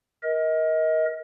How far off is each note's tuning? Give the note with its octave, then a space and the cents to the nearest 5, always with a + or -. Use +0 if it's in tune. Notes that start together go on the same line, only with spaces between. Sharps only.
A#4 +20 D#5 +30